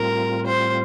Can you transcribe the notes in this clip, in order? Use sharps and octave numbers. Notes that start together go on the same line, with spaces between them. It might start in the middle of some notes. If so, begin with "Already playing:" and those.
Already playing: A2 G3 C4 F4 A#4
C5